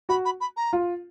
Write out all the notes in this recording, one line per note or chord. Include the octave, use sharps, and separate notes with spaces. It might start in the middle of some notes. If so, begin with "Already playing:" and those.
F#4 B5
B5
B5
A#5
F4